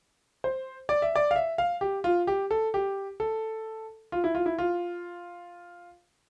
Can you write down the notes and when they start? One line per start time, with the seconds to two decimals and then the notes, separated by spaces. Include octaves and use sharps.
0.44 C5
0.89 D5
1.02 E5
1.16 D5
1.31 F5
1.36 E5
1.58 F5
1.81 G4
2.04 F4
2.27 G4
2.51 A4
2.74 G4
3.20 A4
4.12 F4
4.24 E4
4.35 F4
4.46 E4
4.58 F4